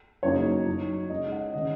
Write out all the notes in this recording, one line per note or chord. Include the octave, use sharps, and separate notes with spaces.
F#2 C#3 F#3 A#3 D#4 C#5
F#2 F#3 D#4
C#3 G#3 D#4 D#5
F#5
D#3 G#3 C#4 D#5